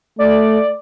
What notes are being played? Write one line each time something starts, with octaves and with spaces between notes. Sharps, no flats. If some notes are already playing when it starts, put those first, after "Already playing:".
A3 D5